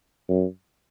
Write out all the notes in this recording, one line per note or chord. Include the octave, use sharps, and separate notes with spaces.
F#2